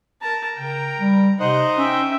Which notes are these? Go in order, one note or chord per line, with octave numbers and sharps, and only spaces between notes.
A#4 A5 A#5
C#3 A#4 G5
G3
C3 D#4 C5 D#5 F#5
C#4 E5 G5